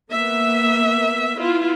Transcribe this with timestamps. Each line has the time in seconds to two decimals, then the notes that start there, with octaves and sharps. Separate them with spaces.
0.12 A#3 B3 E5
1.39 B3 E4 F4